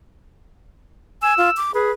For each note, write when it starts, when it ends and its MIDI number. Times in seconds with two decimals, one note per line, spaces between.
1.22 1.34 80
1.22 1.58 88
1.38 1.50 65
1.57 1.72 86
1.74 1.91 68
1.74 1.92 71